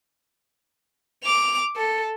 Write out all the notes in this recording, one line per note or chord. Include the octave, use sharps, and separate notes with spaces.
D6 F7
A4